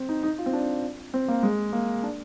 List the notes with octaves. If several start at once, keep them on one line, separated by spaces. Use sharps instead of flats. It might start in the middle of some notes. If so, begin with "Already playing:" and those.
Already playing: C4
D#4
D#4
F4
C4
D4
C4
A#3
G#3
A#3
D4